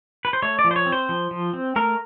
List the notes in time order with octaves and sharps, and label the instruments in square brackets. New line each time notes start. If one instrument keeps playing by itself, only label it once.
[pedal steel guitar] B4
C5
A3 C#5
D5
F3
C5
C#5
C4
C5
F3
F3
C4
A3 A#4